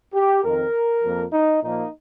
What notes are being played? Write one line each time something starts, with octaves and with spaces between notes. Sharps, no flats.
G4
F2 D#3 C4 A#4
F2 F3 A#3
D#4
A#2 F3 A#3 D#4